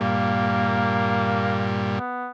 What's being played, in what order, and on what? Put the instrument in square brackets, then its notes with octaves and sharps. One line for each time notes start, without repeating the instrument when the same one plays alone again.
[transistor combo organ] G2 A#2 G3 [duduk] A#3
[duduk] B3